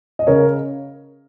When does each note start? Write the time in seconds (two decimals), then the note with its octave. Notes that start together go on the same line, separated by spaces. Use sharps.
0.19 D#5
0.27 C#3 A#4 C#5